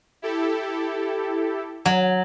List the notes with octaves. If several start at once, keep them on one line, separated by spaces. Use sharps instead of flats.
E4 G4 A4
F#3